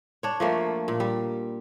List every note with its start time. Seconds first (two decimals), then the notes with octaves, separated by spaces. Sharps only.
0.23 D4 C#5
0.40 F3 A3 A#3
0.88 A#2
1.00 G3